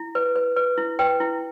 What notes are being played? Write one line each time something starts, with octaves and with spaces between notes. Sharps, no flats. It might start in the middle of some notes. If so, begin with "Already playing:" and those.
Already playing: E4
B4
B4
B4
E4
B4 G5
E4